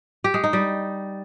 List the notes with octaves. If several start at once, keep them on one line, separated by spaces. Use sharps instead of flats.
G4
G#3
D#4
G3